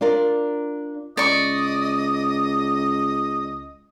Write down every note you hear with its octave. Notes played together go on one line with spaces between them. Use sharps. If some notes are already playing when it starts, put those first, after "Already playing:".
D4 F4 A#4 D5
C#2 D5 D#5 C#6